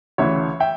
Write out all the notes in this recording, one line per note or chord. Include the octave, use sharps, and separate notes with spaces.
D2 C#3 E3 C#5 E5
E5 G5